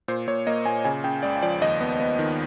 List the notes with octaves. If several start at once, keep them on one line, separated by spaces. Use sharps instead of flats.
A#2 C5
A#2 C#5
A#3 D#5
A#2 G#5
C#3 G#5
C#3 G5
C#2 D5
F3 D5
D#2 D#5
B3
B3
D#3